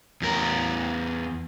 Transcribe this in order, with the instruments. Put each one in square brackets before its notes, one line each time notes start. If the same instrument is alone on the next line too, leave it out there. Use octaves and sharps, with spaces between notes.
[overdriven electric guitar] E2 A#4